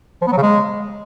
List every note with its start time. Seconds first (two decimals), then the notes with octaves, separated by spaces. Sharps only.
0.22 F3
0.27 B3
0.32 F#3
0.37 C#3
0.43 G#3